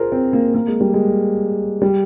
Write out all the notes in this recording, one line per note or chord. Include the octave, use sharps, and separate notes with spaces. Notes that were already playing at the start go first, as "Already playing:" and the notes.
Already playing: F4 G#4 A#4 C5
C4
A#3
A#3
G#3
G3
G#3
G3